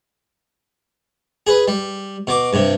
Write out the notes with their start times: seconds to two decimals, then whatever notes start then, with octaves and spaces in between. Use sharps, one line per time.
1.47 G#4 B4
1.68 G3
2.27 B2 D6
2.53 G2 C3